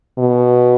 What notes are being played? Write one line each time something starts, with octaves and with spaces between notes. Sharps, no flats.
B2